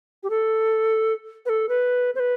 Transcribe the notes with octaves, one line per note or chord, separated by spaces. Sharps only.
G4
A4
B4
A4
B4
C5
B4